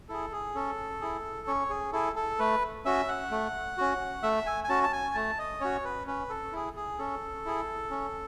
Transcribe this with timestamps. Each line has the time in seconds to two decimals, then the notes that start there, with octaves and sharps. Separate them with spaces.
0.09 E4 G#4 A4
0.32 G#4
0.55 C#4 A4
1.01 E4 G#4
1.47 C#4 C#5
1.70 G#4
1.93 E4 G#4 A4
2.16 A4
2.39 A3 B4
2.86 C#4 F#4 E5
3.08 F#5
3.31 A3
3.78 C#4 F#4
4.23 A3 E5
4.46 G#5
4.64 G#5
4.69 C#4 F#4 A5
4.84 A5
4.93 G#5
5.14 A3 A5
5.39 D#5
5.60 C#4 F#4 C#5
5.85 B4
6.07 C#4 B4
6.30 A4
6.53 E4 G#4
6.76 G#4
6.98 C#4 A4
7.45 E4 G#4
7.91 C#4